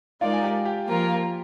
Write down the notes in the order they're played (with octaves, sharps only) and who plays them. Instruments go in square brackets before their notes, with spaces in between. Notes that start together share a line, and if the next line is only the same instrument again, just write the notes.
[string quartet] G#3 D#4 A#4 D5 [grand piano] F4 F5
[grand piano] G#5
G4 G5
G4 G5
[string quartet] F3 A#3 F4 A#4